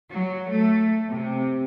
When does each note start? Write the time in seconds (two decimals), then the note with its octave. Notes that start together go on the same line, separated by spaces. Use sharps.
0.13 F#3
0.49 A3
1.09 C3